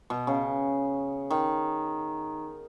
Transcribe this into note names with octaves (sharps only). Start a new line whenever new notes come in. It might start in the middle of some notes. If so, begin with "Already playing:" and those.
B2
C#3
D#3